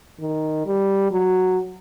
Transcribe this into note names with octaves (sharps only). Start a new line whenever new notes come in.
D#3
G3
F#3